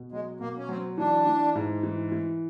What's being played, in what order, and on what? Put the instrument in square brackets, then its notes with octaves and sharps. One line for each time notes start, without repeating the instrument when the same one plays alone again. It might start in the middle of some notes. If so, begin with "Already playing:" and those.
Already playing: [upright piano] B2
[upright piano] F#3 [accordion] G#3
[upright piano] B2 [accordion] A#3
[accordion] C#4
[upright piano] F#3 [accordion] C4
[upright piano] E3 [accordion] D4
[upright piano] E3
G#2
E3
E3